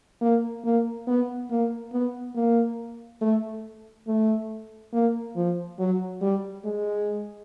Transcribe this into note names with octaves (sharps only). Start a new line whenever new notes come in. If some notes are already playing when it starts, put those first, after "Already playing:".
A#3
A#3
B3
A#3
B3
A#3
A3
A3
A#3
F3
F#3
G3
G#3